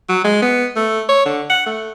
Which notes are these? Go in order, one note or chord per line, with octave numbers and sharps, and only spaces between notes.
F#3
G#3
B3
A3
C#5
D3
F#5
A3